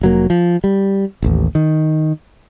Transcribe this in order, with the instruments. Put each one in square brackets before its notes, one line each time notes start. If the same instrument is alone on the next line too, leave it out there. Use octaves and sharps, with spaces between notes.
[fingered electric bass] F1 F#3 A#3
F3
G3
E1 A1 D#2
D#3